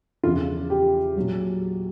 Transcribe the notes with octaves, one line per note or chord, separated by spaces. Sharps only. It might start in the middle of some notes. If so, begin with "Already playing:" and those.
E2 C#3 F3 F4
G4
A#2 F#3